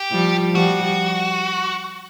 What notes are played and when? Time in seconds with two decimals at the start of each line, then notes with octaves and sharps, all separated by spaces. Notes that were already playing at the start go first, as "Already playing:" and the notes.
Already playing: G4
0.12 F3 G3
0.54 F3 G3 F#4